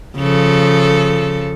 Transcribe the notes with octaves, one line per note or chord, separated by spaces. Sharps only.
C#3 F3 A4